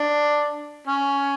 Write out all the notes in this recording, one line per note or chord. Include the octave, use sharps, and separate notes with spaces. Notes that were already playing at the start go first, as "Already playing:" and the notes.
Already playing: D4
C#4